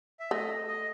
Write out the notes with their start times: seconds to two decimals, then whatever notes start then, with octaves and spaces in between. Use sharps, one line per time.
0.20 E5
0.31 A3 D#5
0.68 D#5